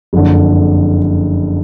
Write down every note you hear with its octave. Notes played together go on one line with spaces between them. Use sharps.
F#1 F2 D3